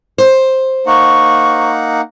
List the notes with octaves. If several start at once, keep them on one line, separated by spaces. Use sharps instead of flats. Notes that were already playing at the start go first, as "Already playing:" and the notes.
C5
A#3 D#4 F#5 C#6